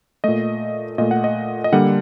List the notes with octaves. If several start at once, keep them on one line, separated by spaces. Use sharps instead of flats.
A#2 A3 D#5
A#2 A3 D#5
F#5
D#5
D#5
D3 G3 A#3 F#5